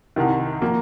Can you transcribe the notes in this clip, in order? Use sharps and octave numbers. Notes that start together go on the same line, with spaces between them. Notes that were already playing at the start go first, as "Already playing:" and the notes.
C2 C3 D#3
F3 A#3